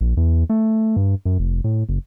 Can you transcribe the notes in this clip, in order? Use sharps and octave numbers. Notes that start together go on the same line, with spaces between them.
A#1
E2
A3
G2
F#2
F1
A2
F#1